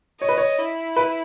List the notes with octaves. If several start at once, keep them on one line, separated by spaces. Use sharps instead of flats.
C#5 D#5
B4
C#5
E4
B4